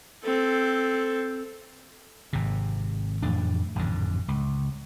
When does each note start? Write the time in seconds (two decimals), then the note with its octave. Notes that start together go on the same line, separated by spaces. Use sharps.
0.24 C4 A4
2.33 G#1 C3
3.22 F2 A2 E3 D4
3.76 A1 F2 G#2 D3
4.28 C#2